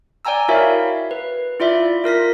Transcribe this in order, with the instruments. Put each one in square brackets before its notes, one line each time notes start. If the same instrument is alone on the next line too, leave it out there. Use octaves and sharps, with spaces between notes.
[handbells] D5 G5 G#5 A#5 E6
E4 F#4 A#4 C#5 E5 F5
B4
E4 F4 D5 E5
F4 A#4 A#6 B6